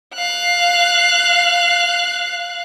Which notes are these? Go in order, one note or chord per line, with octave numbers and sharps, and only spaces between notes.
F5 F#6